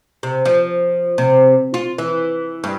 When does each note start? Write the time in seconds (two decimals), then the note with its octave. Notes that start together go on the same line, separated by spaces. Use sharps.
0.23 C3
0.45 F3
1.18 C3
1.74 F4
1.98 E3
2.64 G2